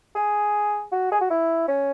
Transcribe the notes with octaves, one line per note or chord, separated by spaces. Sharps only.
G#4
F#4
G#4
F#4
E4
C#4